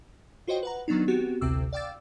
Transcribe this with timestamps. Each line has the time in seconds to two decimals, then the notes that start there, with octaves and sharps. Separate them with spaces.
0.47 F4 F#4 C5 C#5 D#5 G5
0.63 B4 F#5 A#5
0.88 D#3 F#3 B3 D4 D#4
1.08 B3 C4 F#4 G4
1.41 A1 D2 C3 C4 D6 E6
1.73 D5 F5 G5 D6 E6 A6